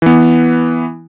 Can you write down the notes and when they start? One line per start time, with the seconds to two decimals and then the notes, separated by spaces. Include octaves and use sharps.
0.02 E3 B3